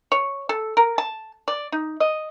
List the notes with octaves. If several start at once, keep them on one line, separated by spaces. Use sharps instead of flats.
C#5
A4
A#4
A5
D5
D#4
D#5